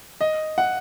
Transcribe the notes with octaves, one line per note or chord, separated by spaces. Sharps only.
D#5
F#5